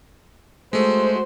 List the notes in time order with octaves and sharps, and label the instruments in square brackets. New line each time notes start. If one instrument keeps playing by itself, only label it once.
[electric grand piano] G#3 A3 [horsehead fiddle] F#4 C5